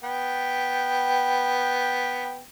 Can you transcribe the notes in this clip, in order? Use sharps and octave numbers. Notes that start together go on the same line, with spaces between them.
B3 G5